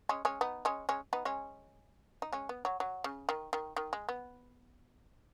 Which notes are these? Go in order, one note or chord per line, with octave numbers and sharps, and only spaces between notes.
G#3 C#4
G#3 C#4
B3 D#4
G#3 C#4
G#3 C#4
B3 D#4
G#3 C#4
D#4
G#3 C#4
B3
F#3
F#3
C#3
D#3
D#3
D#3
G#3
B3